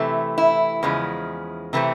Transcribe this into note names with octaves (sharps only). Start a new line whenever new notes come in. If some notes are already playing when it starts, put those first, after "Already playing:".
Already playing: C3 E3 A3
E4
E2 C#3 F3 G#3
C3 E3 A3 C4